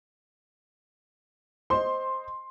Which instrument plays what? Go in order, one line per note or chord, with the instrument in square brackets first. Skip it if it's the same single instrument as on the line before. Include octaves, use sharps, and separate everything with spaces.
[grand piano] C5 D#5 [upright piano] C6